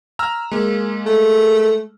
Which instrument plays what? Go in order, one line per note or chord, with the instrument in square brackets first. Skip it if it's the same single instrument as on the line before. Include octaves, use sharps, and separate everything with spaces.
[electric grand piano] A#5 E6 F6
G#3 A#3
[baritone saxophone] A3